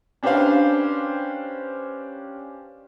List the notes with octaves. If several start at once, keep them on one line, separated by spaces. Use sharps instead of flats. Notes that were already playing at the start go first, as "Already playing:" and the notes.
C#4 D4 G4 B4 C5 F5